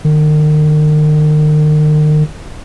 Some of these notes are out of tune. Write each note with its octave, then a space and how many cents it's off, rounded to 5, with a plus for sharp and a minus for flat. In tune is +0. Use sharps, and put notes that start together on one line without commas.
D#3 -40